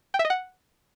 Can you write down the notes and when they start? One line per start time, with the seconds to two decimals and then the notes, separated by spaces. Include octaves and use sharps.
0.14 G5
0.19 E5
0.25 D#5
0.30 F#5